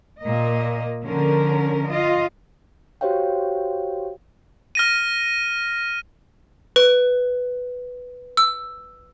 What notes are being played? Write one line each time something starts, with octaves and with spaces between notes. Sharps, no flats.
A#2 A#3 D#5
D3 F3 C#4 A#4
F4 D#5
F#4 G4 C5 C#5 F5 G5
F6 A#6 D#7
B4
E6